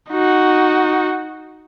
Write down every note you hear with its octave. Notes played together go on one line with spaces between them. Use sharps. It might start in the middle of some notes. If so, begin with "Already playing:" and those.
D#4 F#4